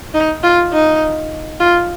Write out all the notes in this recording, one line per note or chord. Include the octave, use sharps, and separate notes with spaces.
D#4
F4
D#4
F4